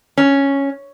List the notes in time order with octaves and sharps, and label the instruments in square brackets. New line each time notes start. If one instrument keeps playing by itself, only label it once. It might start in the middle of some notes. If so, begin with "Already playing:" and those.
[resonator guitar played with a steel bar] C#4